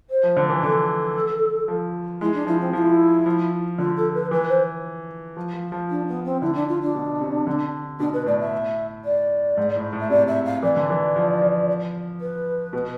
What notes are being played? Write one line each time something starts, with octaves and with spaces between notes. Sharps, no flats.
C5
F3
D3
E3
D3 A4
F3
G#3 E4
D4
F3 E4
C4
F3 E4 F4
F3
D3 F4
A4
B4
E3 B4
C5
F3
F3
F3
D4
B3
C4
D3 E4
D4
F4
D4
B2
C3
D3
B2 D4
B4
A2 D5
E5
D5
G#2
A2
A2
E5
C3 D5
E5
F5
E3 D5
D3
E3
F3
F3
B4
B2